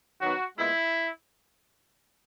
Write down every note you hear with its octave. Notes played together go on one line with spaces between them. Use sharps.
D#3 F#3 B3 D#4 F#4
A#2 G#3 B3 E4